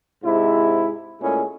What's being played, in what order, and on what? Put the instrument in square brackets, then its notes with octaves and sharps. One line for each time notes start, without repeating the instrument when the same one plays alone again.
[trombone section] G#2 C3 G#3 E4
A#2 G#3 A3 C#4 E4 G#4